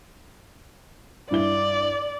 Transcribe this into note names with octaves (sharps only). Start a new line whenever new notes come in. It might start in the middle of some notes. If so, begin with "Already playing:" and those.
G2 E4 D5 G7